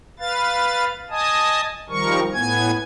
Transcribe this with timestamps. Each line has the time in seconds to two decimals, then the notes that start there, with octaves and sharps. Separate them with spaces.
0.19 B4 F5 A6
1.10 D#5 G#5 A5 D#6
1.89 D#3 F3 G3 A#4 C#6
2.33 A2 B3 G#5 G#6